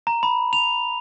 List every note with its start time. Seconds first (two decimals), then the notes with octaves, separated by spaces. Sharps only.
0.07 A#5
0.23 B5
0.53 F7